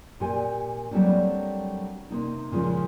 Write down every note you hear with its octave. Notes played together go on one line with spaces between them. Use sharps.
A#2 G4 G#5
F#3 G3 A3 A#3 C4 D4
C3 A#3 D#4
A#2 C#3 F3 G#3